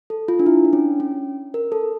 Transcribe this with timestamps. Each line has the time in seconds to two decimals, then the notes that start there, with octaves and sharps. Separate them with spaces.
0.10 A4
0.28 F4
0.39 D4
0.46 E4
0.65 D4
0.73 C#4
1.00 C#4
1.54 A#4
1.72 A4